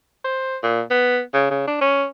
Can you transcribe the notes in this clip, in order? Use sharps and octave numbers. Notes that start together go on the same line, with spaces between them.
C5
A#2
B3
C#3
C#3
D4
C#4